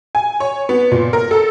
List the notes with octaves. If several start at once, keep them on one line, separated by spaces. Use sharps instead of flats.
G#5
C#5
B3
A#2
A#4
A4